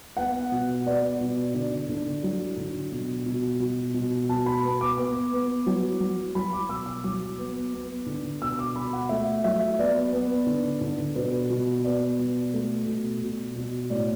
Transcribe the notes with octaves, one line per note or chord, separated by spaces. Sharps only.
B3 F#5
B2
B3 D5
B2
D3 D5
D3
F#3
D3
B2
B2
B2
B2
B2 A5
B5
B3
D6
B3 D6
B3
F#3
F#3
F#3 B5
D6
B2 E6
E6
F#3 D6
B3
B3
D3
B2 E6
D6
B2 B5
F#5
A3 E5
F#3 E5
B3 D5
B3
D3
D3
B2 B4
B2
B3 D5
B2
A3
B2
B2
B2
A2 D5